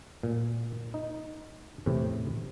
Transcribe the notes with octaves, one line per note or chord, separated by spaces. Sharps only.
A#2
D#4
E2 A2 C3